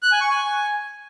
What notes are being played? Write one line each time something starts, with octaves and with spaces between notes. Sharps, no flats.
F#6
G#5
C#6
G#5